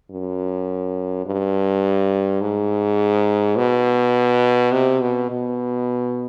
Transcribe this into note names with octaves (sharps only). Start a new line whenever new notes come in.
F#2
G2
G#2
B2
C3
B2
B2